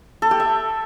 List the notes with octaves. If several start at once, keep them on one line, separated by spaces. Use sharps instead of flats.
A4
G4
E5